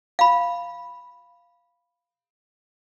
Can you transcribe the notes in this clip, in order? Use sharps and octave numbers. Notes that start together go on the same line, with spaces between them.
F5 B5